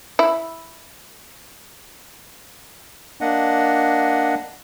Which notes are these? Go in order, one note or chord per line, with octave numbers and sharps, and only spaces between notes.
E4
A#3 D4 D#5 F#5